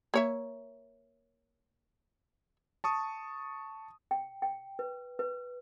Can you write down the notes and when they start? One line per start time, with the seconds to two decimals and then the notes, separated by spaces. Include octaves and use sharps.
0.14 A#3 C#5 E5
2.84 A5 C#6 D#6
4.11 G5
4.42 G5
4.79 B4
5.19 B4